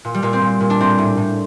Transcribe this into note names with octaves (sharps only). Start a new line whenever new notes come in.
A#2
G3
A#2 A#3
C4
A#2
A#2
D4
A2 C4
A2
A2